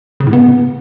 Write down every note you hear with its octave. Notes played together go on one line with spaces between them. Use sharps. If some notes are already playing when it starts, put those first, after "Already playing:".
C#3
A2
B3